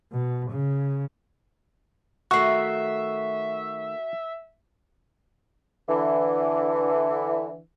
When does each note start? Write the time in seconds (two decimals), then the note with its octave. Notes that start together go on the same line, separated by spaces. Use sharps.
0.13 B2
0.50 C#3
2.31 D#3 A3 F#4 E5 C#6 C7
5.88 D3 E3